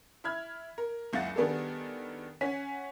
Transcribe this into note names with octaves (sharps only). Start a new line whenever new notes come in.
E4 E5 B5 F6 G#6
A#4
F#1 C#2 E4 F#5 A6
D#3 G3 B3 D4 G#4 A4
C#4 F#5 G#5 B6